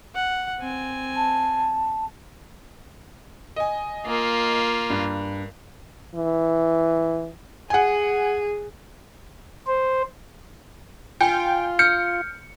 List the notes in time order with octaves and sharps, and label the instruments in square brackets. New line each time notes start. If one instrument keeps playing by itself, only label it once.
[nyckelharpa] F#5
C4 G#5
[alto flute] A5
[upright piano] D#5 G#5
[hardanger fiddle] A#3 F4
[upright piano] G2
[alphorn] E3
[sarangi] G#4 [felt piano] F#5 G#5
[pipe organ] C5
[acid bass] F4 [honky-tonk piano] G5 [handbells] G#5
[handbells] F6 G6 [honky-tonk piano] C#7